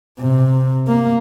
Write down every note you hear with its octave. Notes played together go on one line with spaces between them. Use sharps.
C3
A#3